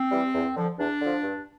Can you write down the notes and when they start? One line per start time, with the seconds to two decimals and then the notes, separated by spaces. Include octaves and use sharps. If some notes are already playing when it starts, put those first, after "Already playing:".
Already playing: C4
0.11 E3 G3
0.33 E2
0.55 D3 F3
0.78 E2 D4
1.00 D3 F3
1.22 G2